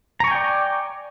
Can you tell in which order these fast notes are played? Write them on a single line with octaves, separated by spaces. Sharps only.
A#5 C#6 G#5 G5 D5